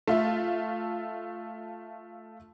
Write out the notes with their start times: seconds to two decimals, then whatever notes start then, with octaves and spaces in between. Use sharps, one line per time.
0.08 A3 F4 E5